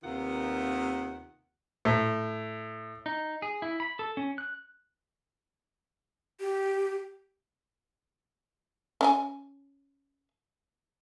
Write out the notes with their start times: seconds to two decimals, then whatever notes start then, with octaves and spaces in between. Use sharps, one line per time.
0.03 D#2 C3 D#3 B3 F4 F#5
1.85 A2
3.06 D#4
3.42 G#4
3.62 E4
3.80 B5
3.99 A4
4.17 C#4
4.38 F#6
6.40 G4
9.01 C#4 F5 G#5